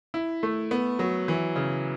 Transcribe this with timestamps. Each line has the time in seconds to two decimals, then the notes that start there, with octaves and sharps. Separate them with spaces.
0.14 E4
0.43 A3
0.71 B3
0.99 F#3
1.28 E3
1.56 C#3